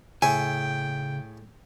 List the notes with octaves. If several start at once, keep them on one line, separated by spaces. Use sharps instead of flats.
A2 C#3 G#4 E5 G5 G#5